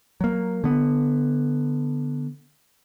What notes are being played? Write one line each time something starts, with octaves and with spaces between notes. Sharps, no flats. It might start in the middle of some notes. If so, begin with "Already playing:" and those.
F#3 A#3
D3 B3